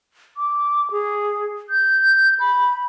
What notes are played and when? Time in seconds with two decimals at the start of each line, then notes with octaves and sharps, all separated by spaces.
0.37 D6
0.91 G#4
1.70 G6
2.40 B5